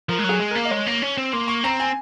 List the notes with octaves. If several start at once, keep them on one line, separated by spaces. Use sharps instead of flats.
F3 A#4
G#3
F#3
G#4
G#3
A#3 A#4
D#5
G#3 C#5
A#3
C#4
C4
A#3 C6
C#6
C4 A#5
G#5